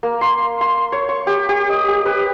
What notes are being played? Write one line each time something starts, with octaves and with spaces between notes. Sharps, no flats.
A#3
C6
C6
C#5
C#6
G4
G4
D#5
G4
B4